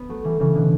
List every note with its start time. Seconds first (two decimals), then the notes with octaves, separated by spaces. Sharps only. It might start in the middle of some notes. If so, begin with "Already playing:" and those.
Already playing: B3
0.09 F#3 A3
0.24 E3 G3
0.40 C#3 E3
0.55 B2 D3